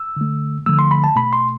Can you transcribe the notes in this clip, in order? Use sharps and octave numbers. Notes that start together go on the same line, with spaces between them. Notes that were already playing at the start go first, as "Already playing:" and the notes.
Already playing: E6
D3 A3
D3 F3 A3 E6
C6
B5
A5
B2 A3 B5
C6